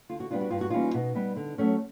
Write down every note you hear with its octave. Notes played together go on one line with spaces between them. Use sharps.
D3 F4
F#4
G3 B3 D4 F4
F#4
G2 F4
F#4
E3 G3 A#3 C#4 D#4 F4
B2 D#4
G3 B3
D3
F#3 A3 C#4